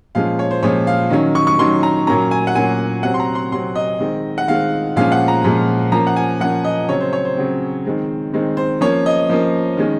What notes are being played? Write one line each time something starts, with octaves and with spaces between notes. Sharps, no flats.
A#2 F3 G#3 C#4 F5
C#5
C5
A#2 F3 G#3 C#4 C#5
F5
D#3 F#3 C#4
C#6
C#6
D#3 F#3 C#4 C6
A#5
A#2 F#3 A#3 C#4 A#5
G#5
F#5
A#2 F#3 A#3 C#4 G#5
C3 F#3 C4 F#5
C6
A#5
C6
C3 F#3 C4 C6
D#5
D#3 G#3 C4
F#5
D#3 G#3 C4 F5
A#2 F3 G#3 C#4 F5
F#5
A#5
A#2 F3 G#3 C#4
F3 A#3 C#4 A#5
F#5
G#5
F3 A#3 C#4 F#5
D#5
C#3 F#3 C4 C#5
C5
C#5
C5
C#3 F#3 C4
D#3 G#3 C4
D#3 G#3 C4
C5
F3 A#3 C#4 C#5
D#5
F3 A#3 C#4
D#3 G#3 C#4